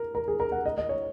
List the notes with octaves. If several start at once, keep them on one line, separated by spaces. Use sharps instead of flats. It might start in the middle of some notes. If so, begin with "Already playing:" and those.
Already playing: A#4
A#4
G#4
A#4
F#5
D#5
D#5
C#5